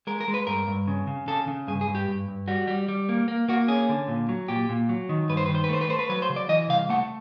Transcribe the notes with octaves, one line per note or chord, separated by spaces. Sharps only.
G#3 A#4
A#4
G#3
B4
G2 A#4
G2
C#3
C#3
C#3 A4
C#3
G2 G#4
G#4
G2
G4
G2
G2
G3 F#4
G3
G3
A#3
A#3
A#3 F#4
C#4 G#4
D3
A#2
F#3
A#2 G4
A#2
F#3
D#3
G2 B4
C5
D#3 B4
C5
B4
A3 C5
B4
A3 C5
B4
F#3 B4
C5
C#3
D5
E3 D#5
C2 F5
A3 F#5